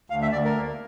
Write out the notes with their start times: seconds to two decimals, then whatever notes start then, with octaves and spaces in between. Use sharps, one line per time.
0.10 D2 F5
0.22 E5
0.32 D2 D5
0.44 A#4
0.56 A#3